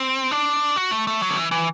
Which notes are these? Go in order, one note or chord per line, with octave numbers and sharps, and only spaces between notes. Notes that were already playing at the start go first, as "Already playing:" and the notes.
Already playing: C4
D4
F#4
A3
A3
F#3
D3
E3
E3